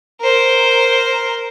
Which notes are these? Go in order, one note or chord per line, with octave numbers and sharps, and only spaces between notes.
A#4 C5